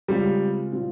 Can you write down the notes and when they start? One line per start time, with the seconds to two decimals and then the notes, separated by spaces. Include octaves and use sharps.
0.08 C#3 G3 G#3 C4 F4
0.73 A#2 G3 C4 F4